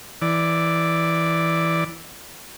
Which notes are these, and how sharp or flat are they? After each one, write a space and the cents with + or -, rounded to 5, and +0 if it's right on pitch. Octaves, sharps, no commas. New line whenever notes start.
E3 +0 D5 +0